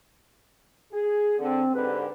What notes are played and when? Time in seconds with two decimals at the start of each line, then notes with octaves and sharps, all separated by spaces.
0.92 G#4
1.39 D3 C4
1.75 G#2 D3 G4 B4